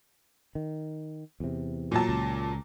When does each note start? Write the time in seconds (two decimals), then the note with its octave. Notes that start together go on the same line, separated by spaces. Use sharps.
0.55 D#3
1.40 E2 C3
1.92 A#2 F#3 A5
2.09 C#2